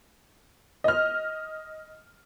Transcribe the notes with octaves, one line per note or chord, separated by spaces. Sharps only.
D#5 F6